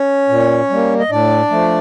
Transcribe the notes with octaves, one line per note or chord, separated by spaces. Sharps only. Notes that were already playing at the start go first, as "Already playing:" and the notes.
Already playing: C#4 C#5
A#2
G3 A#3
D#5
A2 D4 D5
F3 A3